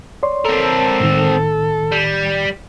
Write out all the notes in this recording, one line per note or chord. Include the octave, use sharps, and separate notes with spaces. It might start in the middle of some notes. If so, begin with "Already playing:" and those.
C#5 D5 C6
C4 A4 A#4
A2 D#3
G3